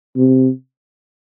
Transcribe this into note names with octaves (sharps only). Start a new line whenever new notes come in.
C3